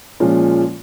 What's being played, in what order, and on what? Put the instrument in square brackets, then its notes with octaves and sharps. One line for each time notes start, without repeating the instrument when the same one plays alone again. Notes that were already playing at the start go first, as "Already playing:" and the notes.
[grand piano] A#2 F3 G#3 C#4 F4